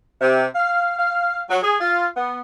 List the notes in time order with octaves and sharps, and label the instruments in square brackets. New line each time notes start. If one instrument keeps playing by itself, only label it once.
[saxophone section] C3
F5
F5
F#3
G#4
F4
B3